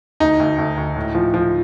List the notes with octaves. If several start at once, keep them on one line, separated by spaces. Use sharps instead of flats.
D2 D#4
D2
D2
D2
A2
F3
F3